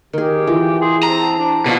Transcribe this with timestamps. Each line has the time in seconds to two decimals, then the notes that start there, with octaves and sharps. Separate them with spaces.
0.13 D#3 G4 G#4 A#4
0.47 E3 F4
0.81 G#4 C6
1.03 C4 A5 A#5
1.39 D4
1.66 B2 F3 F4 D5 A5